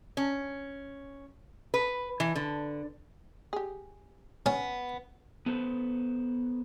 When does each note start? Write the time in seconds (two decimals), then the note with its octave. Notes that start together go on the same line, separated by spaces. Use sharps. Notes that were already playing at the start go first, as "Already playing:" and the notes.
0.17 C#4
1.74 B4
2.20 E3
2.36 D3
3.53 G4 G#4
4.46 B3 C#4
5.46 B3 A4 B4 C5